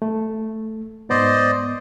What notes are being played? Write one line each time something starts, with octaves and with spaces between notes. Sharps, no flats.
A3
G#2 B3 C5 D5 D#5